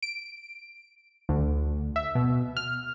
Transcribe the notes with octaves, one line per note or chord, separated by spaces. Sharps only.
D7
D2
E5
B2
F6